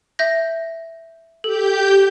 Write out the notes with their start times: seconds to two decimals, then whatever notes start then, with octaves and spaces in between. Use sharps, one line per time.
0.19 E5 G6 A#6
1.44 G4 A4 G6